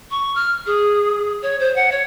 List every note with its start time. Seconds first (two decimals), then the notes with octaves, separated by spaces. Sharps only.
0.10 C#6
0.35 F6
0.66 G#4
1.42 C#5
1.60 C5
1.76 F#5
1.91 C#5